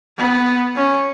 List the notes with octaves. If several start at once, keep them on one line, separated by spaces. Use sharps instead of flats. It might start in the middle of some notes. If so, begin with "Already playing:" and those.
B3
C#4